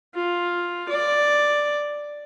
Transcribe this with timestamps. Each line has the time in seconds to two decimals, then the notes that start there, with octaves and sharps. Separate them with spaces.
0.14 F4
0.89 D5